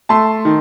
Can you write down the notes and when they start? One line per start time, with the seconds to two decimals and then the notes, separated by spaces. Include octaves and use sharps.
0.09 A3 A5 C6
0.45 D#3